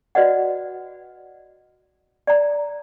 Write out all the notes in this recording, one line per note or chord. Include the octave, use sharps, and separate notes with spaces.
F#4 B4 D5 D#5 F#5
D5 A#5